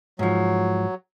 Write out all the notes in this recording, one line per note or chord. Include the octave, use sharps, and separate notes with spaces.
G#2 F3 F#3